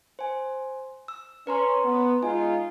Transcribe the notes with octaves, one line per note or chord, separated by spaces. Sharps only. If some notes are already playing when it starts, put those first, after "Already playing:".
C5 G#5
E6
C#4 B4 A#5 C6
B3
G#3 D#4 F4 G#5